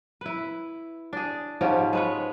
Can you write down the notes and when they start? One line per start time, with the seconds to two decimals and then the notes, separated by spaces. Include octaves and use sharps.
0.21 E4 B4
1.13 D4 G#4
1.61 G#2 F3 C#4 G4
1.93 G#3 B4 C#5